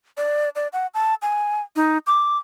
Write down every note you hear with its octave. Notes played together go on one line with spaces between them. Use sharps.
D5
D5
F#5
A5
G#5
D#4
D6